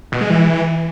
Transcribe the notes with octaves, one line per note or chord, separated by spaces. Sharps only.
B2
G#3
E3